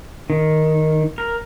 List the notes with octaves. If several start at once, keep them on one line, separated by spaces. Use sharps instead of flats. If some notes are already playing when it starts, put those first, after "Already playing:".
D#3
A#4